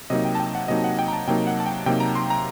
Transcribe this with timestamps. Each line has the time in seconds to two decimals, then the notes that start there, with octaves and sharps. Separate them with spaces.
0.10 C3 F#3 A#3 D#4 D#5
0.25 G5
0.35 A5
0.40 G5
0.55 F#5
0.68 C3 F#3 A#3 D#4 D#5
0.84 F#5
0.99 G5
1.08 A#5
1.13 A5
1.27 C3 F#3 A#3 D#4 G5
1.47 F#5
1.60 A5
1.66 G5
1.86 C3 F#3 A#3 D#4 G5
2.00 A#5
2.15 C6
2.30 A#5